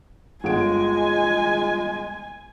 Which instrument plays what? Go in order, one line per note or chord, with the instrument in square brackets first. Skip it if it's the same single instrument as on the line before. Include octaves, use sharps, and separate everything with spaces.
[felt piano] G1 F#5 D7 [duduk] G#3 [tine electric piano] F4 G#4 [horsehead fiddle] G#5